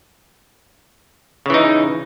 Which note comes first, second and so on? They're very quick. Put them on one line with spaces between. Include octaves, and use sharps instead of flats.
C#3 E3 D#4